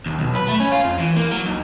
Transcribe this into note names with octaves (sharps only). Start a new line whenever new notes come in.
D#2
B1
B4
A3
C#4
F4
F2
E3
A#3
F#3
D#2